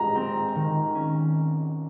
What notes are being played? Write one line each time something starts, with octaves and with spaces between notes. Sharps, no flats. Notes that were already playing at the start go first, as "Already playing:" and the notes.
Already playing: G#3 A#5
C4
D#3
C#4